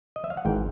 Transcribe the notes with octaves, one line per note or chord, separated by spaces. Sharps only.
D#5
E5
F5
F#5
G#1 G#2 E3 G5